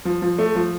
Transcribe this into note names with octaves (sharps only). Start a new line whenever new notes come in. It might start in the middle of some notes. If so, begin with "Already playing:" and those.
F3
F3
A3
F3